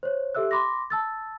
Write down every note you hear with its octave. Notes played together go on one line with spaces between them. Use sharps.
C5 C#5
G4 A4 E5 E6 F#6
B5 C6 D6 A#6
A5 E6 A6